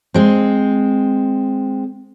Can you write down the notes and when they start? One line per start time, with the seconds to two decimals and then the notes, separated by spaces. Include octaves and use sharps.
0.14 G#3 C4